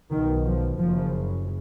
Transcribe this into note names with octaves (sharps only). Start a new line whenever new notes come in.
B1 B2 D#3
F3
F#1 F#2 C#3 F3